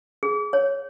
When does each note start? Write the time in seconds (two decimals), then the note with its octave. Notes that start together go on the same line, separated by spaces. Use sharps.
0.23 G#4
0.53 C#5